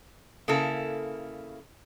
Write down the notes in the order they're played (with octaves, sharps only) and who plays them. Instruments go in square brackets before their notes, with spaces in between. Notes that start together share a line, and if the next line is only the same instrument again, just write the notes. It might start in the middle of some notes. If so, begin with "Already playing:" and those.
[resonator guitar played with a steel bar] C#3 A#3 E4 A4